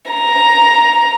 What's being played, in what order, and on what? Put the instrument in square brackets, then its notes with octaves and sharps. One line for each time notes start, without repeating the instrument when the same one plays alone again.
[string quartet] A#5